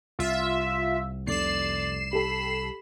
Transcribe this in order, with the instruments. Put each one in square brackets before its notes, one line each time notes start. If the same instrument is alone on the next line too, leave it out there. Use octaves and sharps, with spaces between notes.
[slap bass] C2 [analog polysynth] F4 E5
[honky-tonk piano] F1 [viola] D5 [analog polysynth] C7 E7
[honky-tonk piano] G4 A4 [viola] B5